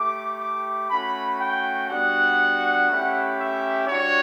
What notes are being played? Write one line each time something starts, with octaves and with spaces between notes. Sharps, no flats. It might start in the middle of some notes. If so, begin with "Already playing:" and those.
Already playing: A3 E4 G4 D6
D6
A3 C#4 F#4 B5
G5
G3 B3 D4 F#4 F#5
A3 C#4 E4 G4
E5
G3 D4 F#4 C#5